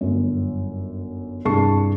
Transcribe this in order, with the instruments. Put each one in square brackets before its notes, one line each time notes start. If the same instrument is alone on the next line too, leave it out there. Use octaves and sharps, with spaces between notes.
[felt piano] G1 F#2
C2 G2 G#4 A5 C#6 C7